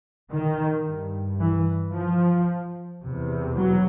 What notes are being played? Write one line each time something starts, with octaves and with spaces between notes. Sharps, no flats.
D#3
G2
E3
F3
E2 C3
F#3